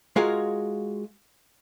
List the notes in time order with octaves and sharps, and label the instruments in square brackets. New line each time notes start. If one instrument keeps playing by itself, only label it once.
[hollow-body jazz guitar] G#3 F4 F#4 G#4 A#4 F5